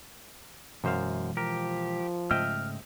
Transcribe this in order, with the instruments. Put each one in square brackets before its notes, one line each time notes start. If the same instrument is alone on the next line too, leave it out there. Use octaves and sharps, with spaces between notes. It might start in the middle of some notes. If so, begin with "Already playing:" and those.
[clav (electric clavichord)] F#2 C5 F5 [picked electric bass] B2 E3 G#3
[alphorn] F3 [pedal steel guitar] G4 [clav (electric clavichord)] A#4
[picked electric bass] G#2 C#3 A3 [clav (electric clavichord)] D#5 E5 G5 [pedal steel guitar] F6